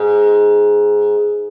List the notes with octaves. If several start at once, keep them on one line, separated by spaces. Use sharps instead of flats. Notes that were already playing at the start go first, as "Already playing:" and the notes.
Already playing: G#2